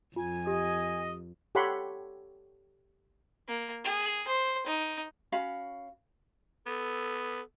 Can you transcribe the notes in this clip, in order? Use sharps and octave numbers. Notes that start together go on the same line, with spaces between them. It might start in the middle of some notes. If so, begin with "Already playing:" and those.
F2 F4 G#5
G4 D#5
G4 A4 C#5 F#5 B5 C6
A#3
G#4
C5
D#4
C#4 F#4 F5 B5
B3 A4